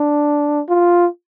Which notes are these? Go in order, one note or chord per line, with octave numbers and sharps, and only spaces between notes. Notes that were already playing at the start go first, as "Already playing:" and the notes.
Already playing: D4
F4